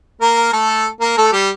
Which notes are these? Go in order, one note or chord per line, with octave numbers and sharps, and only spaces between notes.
A#3 A#4
A3 A4
A#3 A#4
A3 A4
G3 G4